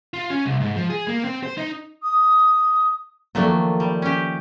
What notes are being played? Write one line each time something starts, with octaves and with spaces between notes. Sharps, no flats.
F4
C#4
C2
G#2
F3
G#4
A#3
C4
C5
D#4
D#6
D#3 F3 F#3 A3 A#3 D4
G3
C#4 G4